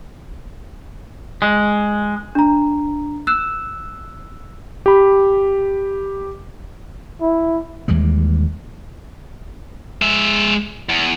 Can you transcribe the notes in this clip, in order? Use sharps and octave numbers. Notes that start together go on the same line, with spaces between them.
G#3
D4 A#5
E6 F#6 E7
G4 B5
E4
D#2 E3 G3 G#3
G#3 E5
E2